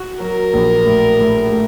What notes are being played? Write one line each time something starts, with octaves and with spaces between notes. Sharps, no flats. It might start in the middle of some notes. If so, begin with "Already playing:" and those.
Already playing: F#4
F#3 A#4
A#1
A2
A2
A3